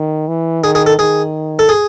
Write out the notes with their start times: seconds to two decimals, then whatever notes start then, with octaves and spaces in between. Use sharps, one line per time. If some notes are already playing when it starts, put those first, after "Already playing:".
Already playing: D#3
0.28 E3
0.63 D#3 G#4
0.75 G#4
0.86 A4
0.99 D#3 G#4
1.59 A4
1.69 G#4